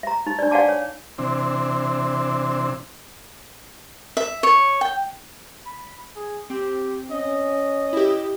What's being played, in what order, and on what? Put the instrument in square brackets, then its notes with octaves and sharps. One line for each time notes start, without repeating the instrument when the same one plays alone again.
[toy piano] E5 A#5
D#4
D4 D5
D5 F5 F#5 G#5 A5 D6
C#5
[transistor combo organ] C3 E3 C4 D4
[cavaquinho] E5
C#5
G5
[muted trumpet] B5
G#4
[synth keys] C4 [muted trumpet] G4
[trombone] C#4 [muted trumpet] D#5
[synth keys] E4 G4